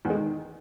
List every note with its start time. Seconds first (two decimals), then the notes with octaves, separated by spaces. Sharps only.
0.05 E2
0.10 G#3
0.15 D#3